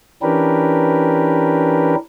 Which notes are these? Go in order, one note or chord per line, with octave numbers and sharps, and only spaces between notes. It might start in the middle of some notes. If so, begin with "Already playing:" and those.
E3 C#4 D4 G4 A#4 B4